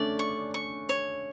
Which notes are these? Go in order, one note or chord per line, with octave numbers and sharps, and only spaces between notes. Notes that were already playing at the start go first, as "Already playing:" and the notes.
Already playing: A3 C#4 D4 D5
C#6
C#6
C#5